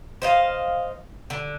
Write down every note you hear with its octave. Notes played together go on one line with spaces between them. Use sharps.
C5 D#5 F5
D3